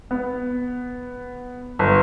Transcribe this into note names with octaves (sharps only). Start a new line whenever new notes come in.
B3
G1